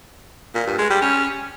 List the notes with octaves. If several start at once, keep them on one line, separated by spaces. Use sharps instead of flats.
A#2
G2
G#3
G3
C#4